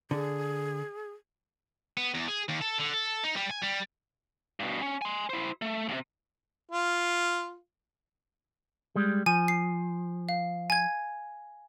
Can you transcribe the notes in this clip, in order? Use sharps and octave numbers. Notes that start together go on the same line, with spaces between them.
D3 G#4
B3
E2
G#4
D#2
A4
D3
A4
D#4
G3
G#5
G3
G2 B2
C#4
G#5 C6
E4 C5
A3
D#2 C3
F4
G3 G#3
F3 G#5 D#7
C7
F5
G#5 G#6